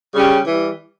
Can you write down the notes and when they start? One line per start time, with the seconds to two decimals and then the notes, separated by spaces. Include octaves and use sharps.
0.14 C#3 G3 C#4 G4
0.46 E3 G3